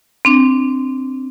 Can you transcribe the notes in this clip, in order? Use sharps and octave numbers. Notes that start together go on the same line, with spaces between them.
C4 D4